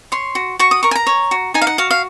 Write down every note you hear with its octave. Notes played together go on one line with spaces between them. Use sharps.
C#5 C6
F#4
F#4 C#6
D#6
A#4 C#6
G#5
A#5
C#5
F#4
D#4 G#5
F5
F#5
F#4 F5
F5